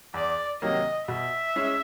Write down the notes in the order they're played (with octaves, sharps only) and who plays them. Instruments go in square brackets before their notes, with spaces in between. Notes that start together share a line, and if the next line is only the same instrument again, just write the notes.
[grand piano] E2 [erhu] D5
[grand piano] C3 D#3 F#3 A#3 [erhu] D#5
[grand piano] B2 [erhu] E5
[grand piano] G#3 C#4 E4